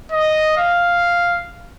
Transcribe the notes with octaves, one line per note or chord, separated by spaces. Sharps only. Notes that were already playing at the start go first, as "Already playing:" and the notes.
D#5
F5